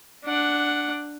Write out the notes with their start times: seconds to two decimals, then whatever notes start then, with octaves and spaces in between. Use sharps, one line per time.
0.25 D4 F#5